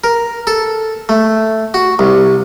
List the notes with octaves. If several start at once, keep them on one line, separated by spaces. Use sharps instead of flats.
A#4
A4
A3
F#4
C2